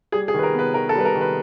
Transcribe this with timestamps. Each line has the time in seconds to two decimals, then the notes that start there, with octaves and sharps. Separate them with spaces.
0.12 G3 G#4
0.28 G#4
0.34 D#3 B4
0.43 A#4
0.54 B3 B4
0.74 D#3 A#4
0.89 A4
0.95 G3 B4
1.05 A#4
1.15 D#3
1.21 B4